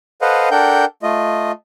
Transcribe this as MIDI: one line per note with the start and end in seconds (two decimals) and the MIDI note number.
0.21 0.49 69
0.21 0.49 71
0.21 0.49 72
0.21 0.49 75
0.21 0.49 77
0.21 0.49 78
0.51 0.85 62
0.51 0.85 69
0.51 0.85 70
0.51 0.85 78
0.51 0.85 79
0.51 0.85 91
1.03 1.52 57
1.03 1.52 65
1.03 1.52 75